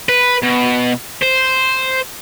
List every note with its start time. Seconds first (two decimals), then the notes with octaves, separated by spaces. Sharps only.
0.09 B4
0.42 B2
1.22 C5